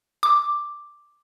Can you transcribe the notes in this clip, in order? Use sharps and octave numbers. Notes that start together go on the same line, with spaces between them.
D6